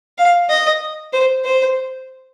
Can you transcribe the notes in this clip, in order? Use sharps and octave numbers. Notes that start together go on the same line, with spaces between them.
F5
D#5
C5
C5